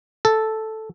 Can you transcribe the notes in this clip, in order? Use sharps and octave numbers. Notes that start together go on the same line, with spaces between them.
A4